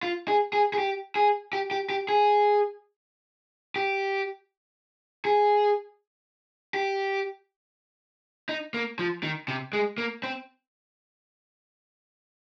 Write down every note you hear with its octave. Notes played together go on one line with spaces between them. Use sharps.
F4
G#4
G#4
G#4
G4
G#4
G4
G4
G4
G#4
G4
G#4
G4
D#4
A#3
F3
D#3
C3
G#3
A#3
C4